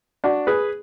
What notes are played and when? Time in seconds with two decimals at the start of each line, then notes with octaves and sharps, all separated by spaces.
0.24 D4 F#4
0.47 G#4 B4